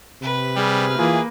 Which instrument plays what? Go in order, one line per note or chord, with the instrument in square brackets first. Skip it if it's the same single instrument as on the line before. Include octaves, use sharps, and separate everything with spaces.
[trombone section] C3 [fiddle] B4
[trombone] G3 [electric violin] G#4 F6
[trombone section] E3 F4 [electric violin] A#3 [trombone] G#4